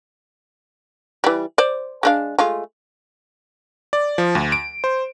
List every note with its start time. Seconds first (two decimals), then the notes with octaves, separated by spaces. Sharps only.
1.24 E3 G3
1.58 C5 D5
2.03 G#3 D4 F5
2.39 G#3 A3 F4
3.93 D5
4.18 F3
4.35 D2
4.52 D7
4.84 C5